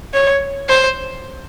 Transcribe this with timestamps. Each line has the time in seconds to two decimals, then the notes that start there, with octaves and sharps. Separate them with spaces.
0.14 C#5
0.69 C5